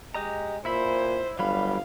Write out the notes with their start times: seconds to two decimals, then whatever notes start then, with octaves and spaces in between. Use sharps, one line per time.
0.15 G#3 G4 D#5 A#5
0.65 A#2 E4 C5 E5 B5
1.39 G1 F#3 G3 F5 B5